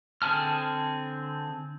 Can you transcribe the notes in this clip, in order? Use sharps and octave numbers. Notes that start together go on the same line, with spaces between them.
D3 C4 G#4 A5 F6